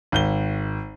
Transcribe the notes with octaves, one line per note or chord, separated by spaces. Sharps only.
G#1 G6 G7